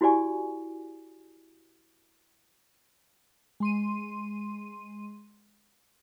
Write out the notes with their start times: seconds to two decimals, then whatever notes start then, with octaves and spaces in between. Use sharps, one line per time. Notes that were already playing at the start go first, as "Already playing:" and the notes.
0.01 E4 F#4 G4 D5 G#5 C#6
3.60 G#3 C6 D#7